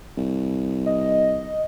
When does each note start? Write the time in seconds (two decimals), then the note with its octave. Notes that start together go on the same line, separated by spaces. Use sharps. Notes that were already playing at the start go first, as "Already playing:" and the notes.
0.17 C2
0.86 D#5